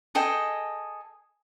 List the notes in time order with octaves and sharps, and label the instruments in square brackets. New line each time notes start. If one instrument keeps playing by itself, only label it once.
[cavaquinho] G#4 A4 D#5 G5